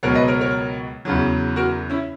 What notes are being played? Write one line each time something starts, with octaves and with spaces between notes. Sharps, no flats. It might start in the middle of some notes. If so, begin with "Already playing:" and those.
C#2 B2 F#3 A#4 C#5
B4 D#5
A#4 C#5
A#4 C#5
E2 C#3 F#3
F#4 A#4
C#4 E4